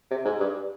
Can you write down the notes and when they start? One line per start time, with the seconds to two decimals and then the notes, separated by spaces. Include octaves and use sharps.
0.11 C3
0.25 G#2
0.40 G2